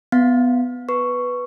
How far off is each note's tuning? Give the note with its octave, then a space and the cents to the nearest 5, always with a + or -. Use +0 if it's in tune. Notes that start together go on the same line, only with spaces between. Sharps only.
B3 +10 F5 +35
B4 +0 C#6 +0